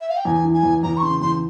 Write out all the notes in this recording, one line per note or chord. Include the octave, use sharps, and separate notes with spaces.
E5
F5
G5
E2 G#5
E3
G#5
E2
E2 A#5
C#6
C#3 C6
E2 C6